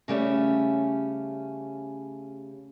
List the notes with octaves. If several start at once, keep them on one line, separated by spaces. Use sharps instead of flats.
C#3 G3 A3 C#4